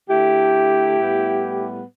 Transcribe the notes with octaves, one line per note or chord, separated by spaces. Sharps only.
D3 A3 E4 G4
A2 G3 B3